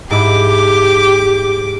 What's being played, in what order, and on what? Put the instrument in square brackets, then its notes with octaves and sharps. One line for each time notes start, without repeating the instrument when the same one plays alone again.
[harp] G#2 E4 [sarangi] G4 [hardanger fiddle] D6